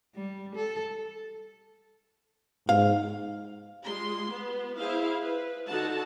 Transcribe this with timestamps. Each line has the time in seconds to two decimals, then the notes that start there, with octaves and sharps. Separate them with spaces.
0.15 G3
0.55 A4
2.69 G#2 F5
3.83 G3 G#3 F4 C6
4.30 B3
4.78 E4 G#4 C5 F5
5.20 B4
5.66 D3 D#4 F#4 A4 F#5 A5